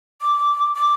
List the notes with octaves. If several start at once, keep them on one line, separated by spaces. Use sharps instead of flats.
D6
D6